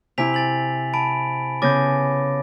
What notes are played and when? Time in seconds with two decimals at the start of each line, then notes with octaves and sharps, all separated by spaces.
0.18 C3 E4 G#5 B6 F7
0.34 G#5 A6 F#7
0.94 A5 B5 D7
1.62 C#3 B3 D6 G6 A6 A#6